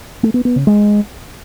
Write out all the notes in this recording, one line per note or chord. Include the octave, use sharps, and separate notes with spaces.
A3
B3
B3
C#3
G#3